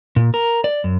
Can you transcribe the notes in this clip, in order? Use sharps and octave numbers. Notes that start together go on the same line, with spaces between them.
A#2
A#4
D5
F#2